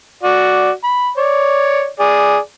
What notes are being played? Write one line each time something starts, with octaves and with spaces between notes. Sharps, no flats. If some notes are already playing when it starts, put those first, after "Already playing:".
F#4 D5
B5
C#5 D5
G#4 D5